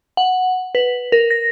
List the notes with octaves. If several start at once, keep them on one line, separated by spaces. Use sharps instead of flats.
F#5
B4
A#4
A#6